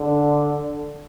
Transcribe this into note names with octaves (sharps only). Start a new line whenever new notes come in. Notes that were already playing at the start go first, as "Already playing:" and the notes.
Already playing: D3